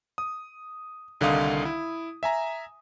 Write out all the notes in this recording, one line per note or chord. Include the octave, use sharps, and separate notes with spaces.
D#6
C2 D3 D#3 D#4 F5 D#6
E4
E5 G#5 A#5